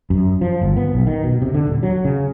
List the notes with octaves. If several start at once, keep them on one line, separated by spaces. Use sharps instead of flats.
F#2
F3
G1
B3
B1
D#3
B2
C3
D3
D#1
F#3
C#3